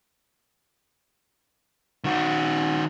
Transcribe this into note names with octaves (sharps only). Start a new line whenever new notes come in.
D#3 F#4